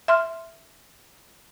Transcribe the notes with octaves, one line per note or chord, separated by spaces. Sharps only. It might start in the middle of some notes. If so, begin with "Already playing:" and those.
E5 C6 F6